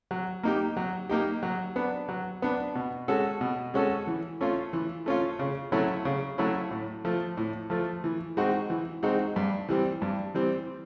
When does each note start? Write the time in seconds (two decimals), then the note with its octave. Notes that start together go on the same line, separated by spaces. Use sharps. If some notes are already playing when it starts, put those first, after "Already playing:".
0.11 F#3
0.43 A#3 D#4 G4
0.77 F#3
1.09 A#3 D#4 G4
1.43 F#3
1.76 B3 D4
2.09 F#3
2.42 B3 D4
2.75 B2
3.08 G#3 C#4 F#4 A4
3.41 B2
3.74 G#3 C#4 F#4 A4
4.07 E3
4.41 A3 C#4 F4
4.73 E3
5.06 A3 C#4 F4
5.39 C#3
5.72 F#3 A3 C#4 E4
6.05 C#3
6.38 F#3 A3 C#4 E4
6.71 A2
7.05 F3 A3
7.37 A2
7.70 F3 A3
8.04 E3
8.37 G#3 C4 D#4 F#4
8.70 E3
9.03 G#3 C4 D#4 F#4
9.36 G2
9.68 E3 G3 C4
10.02 G2
10.34 E3 G3 C4